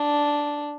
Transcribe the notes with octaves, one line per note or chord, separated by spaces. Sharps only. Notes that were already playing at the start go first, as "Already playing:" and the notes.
Already playing: D4